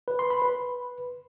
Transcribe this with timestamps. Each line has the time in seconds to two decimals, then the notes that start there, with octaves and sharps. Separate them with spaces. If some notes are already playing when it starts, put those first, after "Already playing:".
0.08 B4
0.19 C6
0.30 B5
0.42 B4